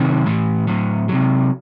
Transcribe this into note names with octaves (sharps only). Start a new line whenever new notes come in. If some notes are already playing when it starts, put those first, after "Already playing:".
Already playing: C3 D#3 F#3
A2 E3
A2 F#3
C3 F#3